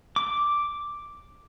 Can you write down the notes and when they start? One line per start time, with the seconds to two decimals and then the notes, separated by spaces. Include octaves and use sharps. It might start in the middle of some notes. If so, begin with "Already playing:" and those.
0.16 D6